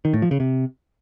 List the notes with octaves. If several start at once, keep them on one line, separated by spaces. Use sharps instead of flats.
D#3
A2
F3
C#3
C3